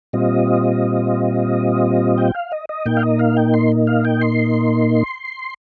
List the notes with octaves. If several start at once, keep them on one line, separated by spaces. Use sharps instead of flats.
A#2 G3 C4 F4 D#5
G5
F5
D#5
D#5
A#2 A#3 D#4 G5
F5
D#5
F5
G5
C6
F5
G5
C6